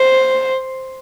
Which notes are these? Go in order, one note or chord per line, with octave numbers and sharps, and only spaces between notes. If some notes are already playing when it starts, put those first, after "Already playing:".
Already playing: C5